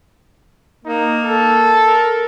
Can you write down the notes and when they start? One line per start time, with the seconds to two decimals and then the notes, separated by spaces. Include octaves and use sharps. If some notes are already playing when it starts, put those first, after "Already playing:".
0.85 A#3 D#4
1.25 A4
1.85 A#4